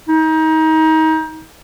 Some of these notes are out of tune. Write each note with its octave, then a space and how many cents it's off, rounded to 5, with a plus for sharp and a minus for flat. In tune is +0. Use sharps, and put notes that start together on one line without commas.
D#4 +30